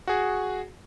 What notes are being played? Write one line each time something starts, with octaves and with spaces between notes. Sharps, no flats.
F#4 G#4